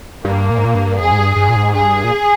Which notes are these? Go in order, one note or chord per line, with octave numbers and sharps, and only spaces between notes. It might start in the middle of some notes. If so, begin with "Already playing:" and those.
G2 A#3
A#2
G#2
A#2
G2
F2 G#4
G#2
G2
G2
A#2
G#2
G2 G#4
A#2